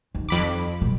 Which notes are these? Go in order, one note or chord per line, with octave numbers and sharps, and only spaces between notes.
D#2
F2 B5 D6
B2 G3